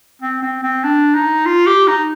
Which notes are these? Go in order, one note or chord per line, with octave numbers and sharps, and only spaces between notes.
C4
C4
C4
D4
D#4
F4
G4
D#4